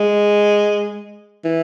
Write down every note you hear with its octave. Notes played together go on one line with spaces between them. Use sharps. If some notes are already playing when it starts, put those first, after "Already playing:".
Already playing: G#3
E3